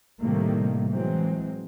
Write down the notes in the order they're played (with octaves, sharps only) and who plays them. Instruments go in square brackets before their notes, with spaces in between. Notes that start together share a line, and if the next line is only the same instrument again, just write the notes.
[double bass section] A2 C3 D#3 G3 A3 A#3
E3 F#3 G#3 C4